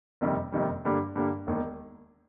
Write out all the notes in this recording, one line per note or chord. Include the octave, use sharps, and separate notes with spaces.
F#1 F2 C3 D#3 G3
F#1 F2 C3 D#3 G3
G2 D3 G3 A#3
G2 D3 G3 A#3
E1 D#2 D#3